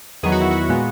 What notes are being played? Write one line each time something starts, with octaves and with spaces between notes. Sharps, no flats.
E2 D#3 F#3 B3 G#4
F#4
E4
F#4
A#2 G#3 B3